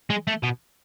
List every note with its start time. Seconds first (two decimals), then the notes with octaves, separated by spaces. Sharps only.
0.10 G#3
0.27 A3
0.43 B2